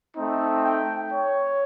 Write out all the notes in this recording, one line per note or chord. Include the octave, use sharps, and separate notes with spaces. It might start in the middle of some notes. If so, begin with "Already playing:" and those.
A3 C4 D#4
G5
C#5